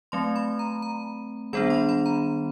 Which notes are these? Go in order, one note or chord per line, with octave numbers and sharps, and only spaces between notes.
F#3 A3 C4 C6
B5
A#5
A#5
D#3 G3 B3 D4 B5
C6
B5
A#5